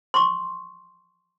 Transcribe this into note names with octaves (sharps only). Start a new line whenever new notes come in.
C6 C#6